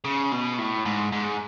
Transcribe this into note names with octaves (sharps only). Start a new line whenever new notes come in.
C#3
B2
A2
G#2
G#2